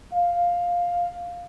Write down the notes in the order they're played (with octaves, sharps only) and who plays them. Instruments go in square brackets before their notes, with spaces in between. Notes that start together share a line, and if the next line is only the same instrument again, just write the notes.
[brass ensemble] F5